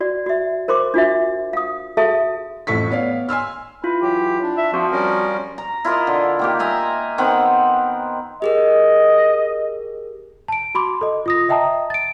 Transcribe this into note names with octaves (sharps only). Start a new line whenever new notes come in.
F#4 D5
F#4 E5
A#4 C5 C6 D6
D4 F4 F#4 E5
F5 D#6
F#4 G#4 A4 E5 F5 A5
A1 F2 A2 A4 C#6 B6
B3 C#5 D5 F5
G#5 C6 E6 F6
E4 F4 B4
E3 F#3 G4
D4
E5
F3 C4 F#4
G3 C#4 A#4
A#5
E4 F4 A#4 D#5
D3
D#3 A#3 G4
D#5 E5 G#5 A#5
D#3 B3 C4 F#5
G4 G#4 A#4 D#5
A5 D7
F#4 B5 C6 D6
A4 D#5
F4 D#6 A#6
D#5 E5 G5 A5 A#5 D#6
A6 D7